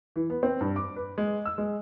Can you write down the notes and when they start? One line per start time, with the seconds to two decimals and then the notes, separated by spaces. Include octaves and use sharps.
0.16 E3
0.30 B3
0.43 C4
0.61 G2
0.76 D6
0.96 B4
1.18 G#3
1.45 E6
1.58 G#3